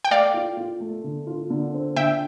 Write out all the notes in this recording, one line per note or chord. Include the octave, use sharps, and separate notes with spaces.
G5
A3 D5 F5
F4
F4
A3
D3
F4
D3
C4
D3 E5 G5